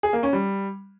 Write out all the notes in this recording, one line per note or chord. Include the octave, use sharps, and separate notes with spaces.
G#4
A#3
C#4
G3